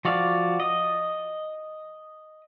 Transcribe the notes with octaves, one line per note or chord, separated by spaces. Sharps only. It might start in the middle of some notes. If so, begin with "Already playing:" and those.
F3 F#4 D5 F5
D#5